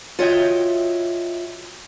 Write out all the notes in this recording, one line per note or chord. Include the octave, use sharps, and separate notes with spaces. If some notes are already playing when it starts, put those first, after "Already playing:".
F4 F#4 C#5 D#5 E5 G5